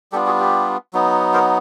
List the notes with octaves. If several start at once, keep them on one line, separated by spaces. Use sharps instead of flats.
G3 B3 D4 F4 G4 A4
F#4 G#4
G4
F#3 B3 D#4
A#4 C5